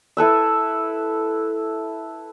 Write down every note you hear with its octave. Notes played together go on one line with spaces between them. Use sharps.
E4 A4 B4 E5